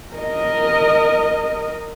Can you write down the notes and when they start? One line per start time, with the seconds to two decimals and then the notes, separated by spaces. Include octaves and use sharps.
0.14 A#4 D#5